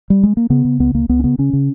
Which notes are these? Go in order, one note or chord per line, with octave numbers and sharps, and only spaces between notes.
G3
G#3
A#3
C#3 B3
C#3
C#2 B3
C#2 A#3
C#2 B3
C#4
C#3 B3
C#3 C#4
C#3